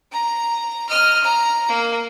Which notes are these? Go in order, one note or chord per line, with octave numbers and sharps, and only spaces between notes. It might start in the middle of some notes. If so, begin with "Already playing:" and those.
A#5
D#5 F6
A#5
A#3